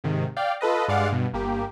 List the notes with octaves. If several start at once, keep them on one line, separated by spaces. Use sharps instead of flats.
G#2 C3 D#3
D5 F5 G5
F4 A4 B4 D#5
G2 G#3 D5 F5 F#5
G2 B2
G1 A#3 G4